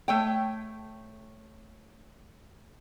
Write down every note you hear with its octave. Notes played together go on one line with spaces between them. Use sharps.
A3 C#5 G5